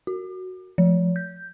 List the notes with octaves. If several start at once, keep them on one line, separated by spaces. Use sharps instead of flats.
F#4
F3
G6